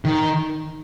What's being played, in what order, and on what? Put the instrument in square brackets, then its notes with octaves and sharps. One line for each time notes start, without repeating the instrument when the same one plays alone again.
[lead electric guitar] D#3